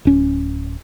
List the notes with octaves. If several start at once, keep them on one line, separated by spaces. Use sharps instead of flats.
D1 C#4